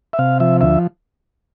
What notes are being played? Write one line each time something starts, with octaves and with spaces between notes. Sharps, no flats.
E5
C3 F5
F3 E5
D2 E5